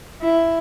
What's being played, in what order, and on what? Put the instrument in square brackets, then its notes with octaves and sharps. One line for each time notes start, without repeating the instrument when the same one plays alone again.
[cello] E4